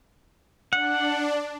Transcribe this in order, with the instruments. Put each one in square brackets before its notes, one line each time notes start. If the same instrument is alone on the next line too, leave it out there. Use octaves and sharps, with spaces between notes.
[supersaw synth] D4 [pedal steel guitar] F#5